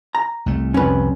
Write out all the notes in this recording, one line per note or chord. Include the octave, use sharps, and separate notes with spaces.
A#5
C2 A3
F1 C2 F2 C#4 B4